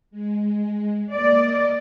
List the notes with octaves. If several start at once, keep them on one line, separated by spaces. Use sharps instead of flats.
G#3
A#3 D5 D#5